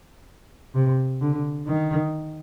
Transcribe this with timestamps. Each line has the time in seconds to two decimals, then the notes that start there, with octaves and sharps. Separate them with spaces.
0.75 C3
1.21 D3
1.68 D#3